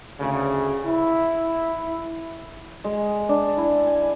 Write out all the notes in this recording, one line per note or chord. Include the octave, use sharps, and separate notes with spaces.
D2 C#3
E4
G#3
D4
E4
G#5